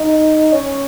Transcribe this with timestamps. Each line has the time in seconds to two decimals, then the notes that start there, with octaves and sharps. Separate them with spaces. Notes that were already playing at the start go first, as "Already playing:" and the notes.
Already playing: D#4
0.52 C#4